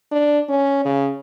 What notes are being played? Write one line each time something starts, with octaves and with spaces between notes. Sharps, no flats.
D4
C#4
C#3